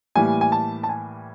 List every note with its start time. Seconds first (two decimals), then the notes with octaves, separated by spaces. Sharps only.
0.15 A2 E3 G3 A#3 G#5
0.41 G#5
0.52 A5
0.83 A5
0.89 G#5